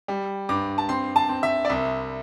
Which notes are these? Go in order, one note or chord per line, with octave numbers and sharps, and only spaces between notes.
G3
G2 D6
A5
C4 C6
A5
C4
E5
D5
C2 E5